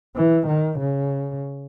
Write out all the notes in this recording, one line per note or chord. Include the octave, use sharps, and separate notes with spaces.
E3
D#3
C#3